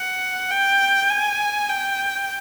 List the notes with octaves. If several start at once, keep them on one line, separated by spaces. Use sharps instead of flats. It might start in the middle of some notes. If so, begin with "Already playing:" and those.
Already playing: F#5
G5
G#5
G5